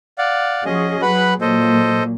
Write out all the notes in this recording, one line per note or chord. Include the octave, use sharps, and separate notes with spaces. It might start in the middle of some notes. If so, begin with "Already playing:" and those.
D5 F5 F#5
F3 C#4 F#4 G#4 D#5
F#3 G#4 B4 F#5 B5
A#2 F#3 A4 C5 D#5